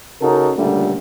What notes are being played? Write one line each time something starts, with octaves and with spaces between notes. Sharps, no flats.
C#3 D#4 F#4 A4 A#4
C#2 A#2 D3 G3 A3